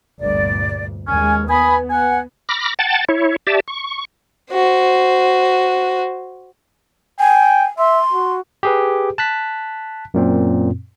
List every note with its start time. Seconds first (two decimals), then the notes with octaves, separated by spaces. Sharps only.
0.20 G1 D2 A#2 D5
1.07 D#2 G#3 C#4 G#5
1.49 B3 G#5 B5 D#6
1.90 F#5 G#5
2.49 B5 D6 F6 A#6
2.79 F#5 G5 A5 A6
3.09 E4 C#5
3.47 G4 D5 E5 A5
3.68 C#6
4.52 F#4 C5
7.20 G5 G#5
7.79 E5 C6
8.13 F#4
8.63 G4 G#4 B4
9.18 A5 F#6 B6
10.14 F#2 A#2 C4